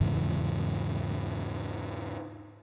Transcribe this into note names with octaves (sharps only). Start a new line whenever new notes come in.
E2 G#2 C#3 E3